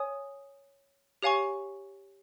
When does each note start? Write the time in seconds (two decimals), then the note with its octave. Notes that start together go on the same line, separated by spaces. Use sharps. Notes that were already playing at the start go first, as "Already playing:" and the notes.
Already playing: C#5 G#5 D#6
1.22 G4 C#5 F5 G#5 C#6